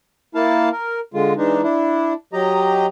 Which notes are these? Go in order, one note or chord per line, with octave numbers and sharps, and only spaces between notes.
A#3 E4 F5 A5
A#4
D3 G#3 F4
E3 G#3 D4 D#4
D4 E4
F#3 G4 D#5 A#5